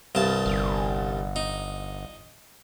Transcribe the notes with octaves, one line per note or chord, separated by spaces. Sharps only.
C2 G2 A5
G1
D#4